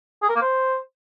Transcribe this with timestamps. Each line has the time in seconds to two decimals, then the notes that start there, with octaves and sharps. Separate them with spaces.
0.23 G#4
0.29 A#4
0.35 A#3
0.42 C5